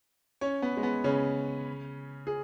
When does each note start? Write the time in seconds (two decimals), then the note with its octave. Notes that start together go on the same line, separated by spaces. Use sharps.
0.41 C#4 C#5
0.62 B3
0.77 G#3
0.83 B3
1.04 C#3 C#4
2.27 G#4